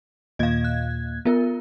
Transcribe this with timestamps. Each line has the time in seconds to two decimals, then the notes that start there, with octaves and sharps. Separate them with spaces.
0.39 D#2 A#2 D#5 F5 G#6
0.64 F#6
1.25 B3 F4 A#4